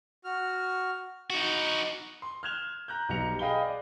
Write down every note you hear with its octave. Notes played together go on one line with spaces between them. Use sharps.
F#4 F6
D#4 F#4
C6
F6 F#6 G#6 E7 F7 G7
A#5 F#6 G6
B1 B2 G3 A#5 C#7 F7
G#4 D#5 F5 G5 B5 G7
D5